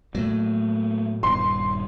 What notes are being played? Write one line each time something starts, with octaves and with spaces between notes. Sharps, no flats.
A2 F#3 A3 A#3
D#1 G2 C6